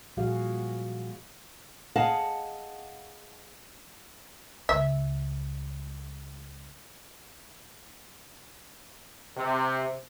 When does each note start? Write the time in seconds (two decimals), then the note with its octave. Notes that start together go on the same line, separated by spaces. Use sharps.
0.17 A#2 F3 G3 F#4 G#4 F5
1.96 G#4 D#5 F5 F#5 A5
4.69 C#2 E5
9.37 C3